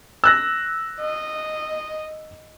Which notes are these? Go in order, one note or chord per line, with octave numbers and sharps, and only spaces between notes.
E6 F#6 A#6
D#5